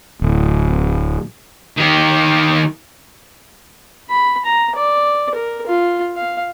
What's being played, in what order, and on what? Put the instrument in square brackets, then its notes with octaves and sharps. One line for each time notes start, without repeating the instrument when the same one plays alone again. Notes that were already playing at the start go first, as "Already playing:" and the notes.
[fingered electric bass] D1
[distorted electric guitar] D#3 G4
[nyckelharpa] B5
A#5
D5
A#4
F4
F5